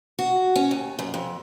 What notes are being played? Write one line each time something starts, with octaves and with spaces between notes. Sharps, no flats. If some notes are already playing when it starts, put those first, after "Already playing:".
F#4
C#4
D#2
F#2
F2